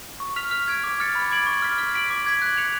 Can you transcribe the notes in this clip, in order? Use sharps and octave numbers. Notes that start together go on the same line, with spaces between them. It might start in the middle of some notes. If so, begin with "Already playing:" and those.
C#6
F6 B6 F7
F6
G#6 D7
D6
F6 A6 C#7
B5
D6 G#6 D7 F#7
C#6
F6 B6
F6
B6 D7 F#7
D6
G#6 B6 F#7
F#6
C#7 F7